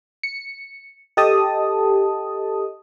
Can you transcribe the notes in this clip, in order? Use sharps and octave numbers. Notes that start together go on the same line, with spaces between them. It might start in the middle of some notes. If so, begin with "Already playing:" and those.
C#7
G4 A4 D#5 A5 D#6